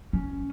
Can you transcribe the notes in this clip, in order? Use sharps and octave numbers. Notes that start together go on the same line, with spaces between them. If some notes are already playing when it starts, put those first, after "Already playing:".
C#4